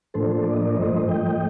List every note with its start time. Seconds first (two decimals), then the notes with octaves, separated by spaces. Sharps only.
0.14 A2 F3 A#3 D4 A4 C5
0.30 A4 C5
0.46 D5
0.54 D#5
0.62 A#4 D5
0.76 G2 F3 A3 C5 D#5
1.08 D#5 G5